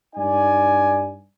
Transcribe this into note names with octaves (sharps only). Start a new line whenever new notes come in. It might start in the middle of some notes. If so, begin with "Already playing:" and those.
G2 D#4 D5 G#5